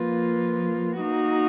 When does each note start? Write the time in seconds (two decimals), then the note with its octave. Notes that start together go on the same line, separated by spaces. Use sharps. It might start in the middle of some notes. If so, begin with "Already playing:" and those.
Already playing: F3 A#3 F4 B4
0.99 A#3 D#4 F#4